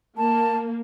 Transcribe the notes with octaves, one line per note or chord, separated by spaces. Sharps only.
A#3 A5